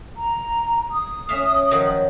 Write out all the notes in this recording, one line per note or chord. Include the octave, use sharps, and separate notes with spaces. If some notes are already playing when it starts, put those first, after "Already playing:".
A#5
D#6
C#4 E5 F5
D#3 F3 F#3